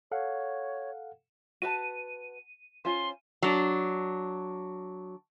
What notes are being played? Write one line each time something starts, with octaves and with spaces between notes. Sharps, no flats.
A4 C#5 F5 F#5
F#4 B4 A5 D#7
C#4 F4 C5 C6
F#3 D4